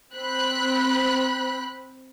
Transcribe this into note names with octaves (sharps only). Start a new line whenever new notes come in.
C4 B5 F#6